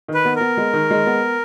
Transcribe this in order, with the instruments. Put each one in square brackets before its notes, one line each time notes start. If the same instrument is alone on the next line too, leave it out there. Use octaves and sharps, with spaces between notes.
[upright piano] D#3
[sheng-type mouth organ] B4
[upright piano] B3
[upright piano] B3 [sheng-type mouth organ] A#4
[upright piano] G#3
D#3
G#3
B3